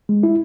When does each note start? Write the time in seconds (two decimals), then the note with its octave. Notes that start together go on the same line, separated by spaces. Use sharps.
0.09 G#3
0.23 E4